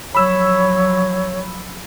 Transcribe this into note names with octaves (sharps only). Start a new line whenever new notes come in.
F3 F#3 C#5 B5 E6